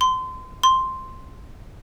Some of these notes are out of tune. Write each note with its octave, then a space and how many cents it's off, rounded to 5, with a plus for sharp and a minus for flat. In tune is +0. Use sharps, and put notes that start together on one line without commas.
C6 -30
C6 +0